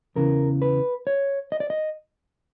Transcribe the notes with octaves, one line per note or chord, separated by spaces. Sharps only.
E2 C#3 E3 A#4
B4
C#5
D#5
D5
D#5